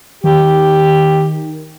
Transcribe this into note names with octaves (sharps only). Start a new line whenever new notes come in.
D#3 G4